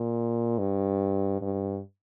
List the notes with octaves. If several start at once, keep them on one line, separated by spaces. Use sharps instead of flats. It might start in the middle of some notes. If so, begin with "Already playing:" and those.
Already playing: A#2
G2
G2